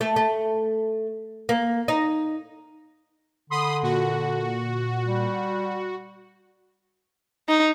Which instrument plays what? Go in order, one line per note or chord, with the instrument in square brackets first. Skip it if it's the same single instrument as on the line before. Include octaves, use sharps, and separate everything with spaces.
[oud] A3
A3
A#3
D#4
[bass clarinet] D3 [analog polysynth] B5 C6 D#6
[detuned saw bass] A#2 [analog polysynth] F#4
[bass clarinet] G3
[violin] D#4